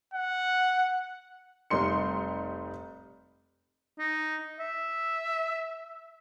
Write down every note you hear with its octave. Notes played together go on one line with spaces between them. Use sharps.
F#5
F1 G3 D#4 C6 C#7
D#4
E5